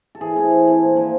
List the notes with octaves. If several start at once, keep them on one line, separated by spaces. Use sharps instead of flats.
A4
E3 G#4
A3 C4 E4
E3
A3 C4 E4
A#2
F3 A#3 D4